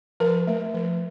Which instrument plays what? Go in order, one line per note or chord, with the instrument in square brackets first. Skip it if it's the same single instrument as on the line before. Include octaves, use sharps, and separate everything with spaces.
[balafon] F3 A#4
A3
F3